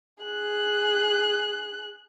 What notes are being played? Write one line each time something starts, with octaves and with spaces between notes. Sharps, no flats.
G#4 F#6